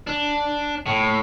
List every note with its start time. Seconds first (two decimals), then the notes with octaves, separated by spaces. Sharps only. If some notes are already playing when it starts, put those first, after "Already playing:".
0.07 D4
0.86 A2